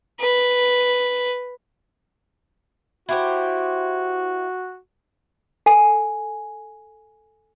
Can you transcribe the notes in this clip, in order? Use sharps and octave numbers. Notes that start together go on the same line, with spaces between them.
B4
E4 F#4 G4 C5
A4 G#5